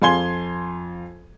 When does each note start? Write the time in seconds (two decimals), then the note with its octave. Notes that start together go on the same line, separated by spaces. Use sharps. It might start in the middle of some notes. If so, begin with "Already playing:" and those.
0.02 F2 F5 G#5 C6 G#6 G7